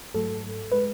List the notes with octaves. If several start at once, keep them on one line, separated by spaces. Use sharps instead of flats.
G#2 F#3 A3 A4
G#3 B4